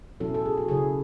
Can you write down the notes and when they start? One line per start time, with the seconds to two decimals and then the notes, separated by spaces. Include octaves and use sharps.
0.20 B2 F#3 C#4 E4 A4
0.34 A4
0.45 G#4
0.58 F#4
0.68 C#3 F#3 C#4 E4 G#4